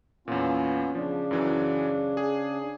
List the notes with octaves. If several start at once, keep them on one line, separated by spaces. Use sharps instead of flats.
E2 A#2 B3 C#4 F4
C#3 F3 D4
F#2 E3 F#3
G#4